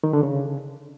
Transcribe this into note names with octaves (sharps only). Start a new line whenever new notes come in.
D#3
D3
C#3